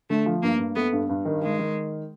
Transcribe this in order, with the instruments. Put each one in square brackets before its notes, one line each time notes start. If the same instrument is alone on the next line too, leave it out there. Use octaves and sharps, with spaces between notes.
[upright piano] D3 [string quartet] A3
[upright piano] F3
[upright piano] G2 [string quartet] A#3
[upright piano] G2
[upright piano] A3 [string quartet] B3
[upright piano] G2
G2
D#3
[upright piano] D#3 [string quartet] G#3
[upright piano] D#3